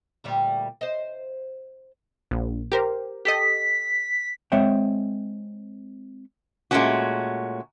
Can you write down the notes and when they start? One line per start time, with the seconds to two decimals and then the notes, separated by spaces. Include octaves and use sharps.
0.24 D2 A#2 G3
0.81 C5 D#5
2.31 A#1
2.72 G4 A#4 C5
3.25 G4 A4 D#5 B6
4.52 G#3 C4 C#5 E5 F#5 G5
6.71 A#2 G#3 A3 B3 C#4 F#4